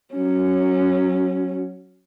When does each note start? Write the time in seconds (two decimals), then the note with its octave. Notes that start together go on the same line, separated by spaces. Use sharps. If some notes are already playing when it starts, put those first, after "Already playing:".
0.14 F#3 C#4